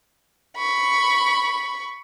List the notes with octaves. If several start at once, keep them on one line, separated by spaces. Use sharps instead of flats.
B5 C#6